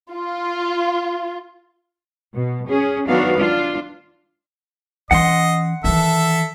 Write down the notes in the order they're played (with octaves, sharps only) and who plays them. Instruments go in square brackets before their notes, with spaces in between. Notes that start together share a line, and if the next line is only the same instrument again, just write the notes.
[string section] F4
[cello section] B2
C#4 G#4
D#3 F#3 B3 D4 F#4 F5
D4 F4
[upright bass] E3 C#4 [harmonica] D#5 [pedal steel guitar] F#5 C6
[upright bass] D#3 E3 [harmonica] A4 E5